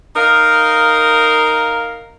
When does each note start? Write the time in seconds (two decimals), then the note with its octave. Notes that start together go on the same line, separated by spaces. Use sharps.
0.16 D#4 A#4 F5